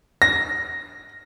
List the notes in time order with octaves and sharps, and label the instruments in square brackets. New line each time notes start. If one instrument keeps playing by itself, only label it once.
[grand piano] A#6